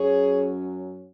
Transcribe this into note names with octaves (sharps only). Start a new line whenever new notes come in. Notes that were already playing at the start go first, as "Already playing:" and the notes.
Already playing: F#2 F#3 C#4 G#4 C#5